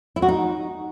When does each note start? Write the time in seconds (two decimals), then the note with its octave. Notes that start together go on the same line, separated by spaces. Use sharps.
0.16 E4
0.22 F#4
0.28 D#4